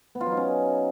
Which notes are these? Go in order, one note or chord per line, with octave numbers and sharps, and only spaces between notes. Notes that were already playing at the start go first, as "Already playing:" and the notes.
B3
F4
F#3
D#4
C#4